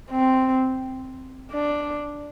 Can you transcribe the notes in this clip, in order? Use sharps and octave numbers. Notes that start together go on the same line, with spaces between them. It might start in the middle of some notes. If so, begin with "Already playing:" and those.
C4
D4